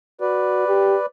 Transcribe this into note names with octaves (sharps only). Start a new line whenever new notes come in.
F#4 B4 D5
G4